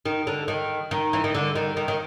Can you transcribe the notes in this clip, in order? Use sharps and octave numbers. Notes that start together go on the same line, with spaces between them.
D#3
D3
D#3
D#3
E3
D#3
D3
D#3
D#3
D#3